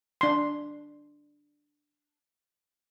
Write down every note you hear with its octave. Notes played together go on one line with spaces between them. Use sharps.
D4 C6